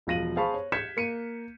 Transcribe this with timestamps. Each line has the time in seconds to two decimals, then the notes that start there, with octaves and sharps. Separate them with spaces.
0.07 E1 F3 F5 A#6 D#7 F#7
0.36 G#4 C5 F5 A5 B5 C#6
0.54 C#5
0.72 G6 G#6 B6 C#7 E7
0.97 A#3 C#7 D#7